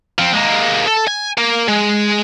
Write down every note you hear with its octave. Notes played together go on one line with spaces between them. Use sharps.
F3 C4
G#3 A#3
A4
G#5
A#3
G#3